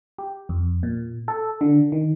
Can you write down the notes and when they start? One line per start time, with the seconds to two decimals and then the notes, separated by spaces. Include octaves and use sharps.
0.18 G4
0.49 F2
0.83 A#2
1.28 A4
1.61 D3
1.92 D#3